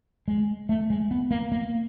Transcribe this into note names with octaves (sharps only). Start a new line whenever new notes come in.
G#3
A3
G#3
B3
A#3
A#3